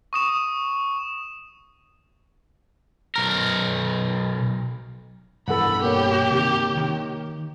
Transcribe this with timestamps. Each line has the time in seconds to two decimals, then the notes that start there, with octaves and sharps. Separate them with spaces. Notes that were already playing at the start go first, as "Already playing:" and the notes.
0.13 C#6 D#6 E7
3.16 B1 A#4
5.48 G2 B2 E3 A4 F#5 B5
5.82 A#3 G4 C#5
6.31 C3 D#3
6.77 D#3